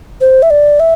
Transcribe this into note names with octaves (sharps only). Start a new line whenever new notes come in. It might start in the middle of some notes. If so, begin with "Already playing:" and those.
C5
E5
D5
E5